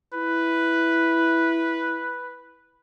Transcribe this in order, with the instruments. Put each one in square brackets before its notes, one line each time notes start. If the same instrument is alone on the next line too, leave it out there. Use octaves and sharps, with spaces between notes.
[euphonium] E4 [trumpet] B4